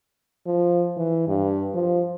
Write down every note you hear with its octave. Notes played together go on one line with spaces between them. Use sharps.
F3
E3
G2
F3